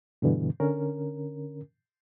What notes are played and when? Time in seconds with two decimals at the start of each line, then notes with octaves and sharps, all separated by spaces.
0.22 G2 B2 D3 E3
0.60 D3 C#4 A#4